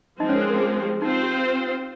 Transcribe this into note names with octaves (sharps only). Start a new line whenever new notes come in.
F3 G#3 C4 D#4 D#5
C#4 C#5
A#4
C5
A#4
G#4
G4
C4 D#4 F4 C5
G4